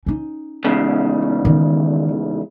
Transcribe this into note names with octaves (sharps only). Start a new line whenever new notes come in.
C#4 D#4
E2 G#2 C#3
D#3